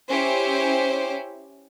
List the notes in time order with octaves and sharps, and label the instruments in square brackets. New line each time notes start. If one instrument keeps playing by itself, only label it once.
[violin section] C#4 E4 G4 C5